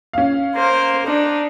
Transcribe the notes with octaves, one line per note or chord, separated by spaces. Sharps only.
C#4 F5
A#3 C5
D4 D#4